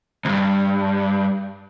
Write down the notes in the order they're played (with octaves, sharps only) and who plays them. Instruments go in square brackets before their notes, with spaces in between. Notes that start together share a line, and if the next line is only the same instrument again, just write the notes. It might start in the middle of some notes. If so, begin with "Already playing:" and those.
[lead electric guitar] D2 G2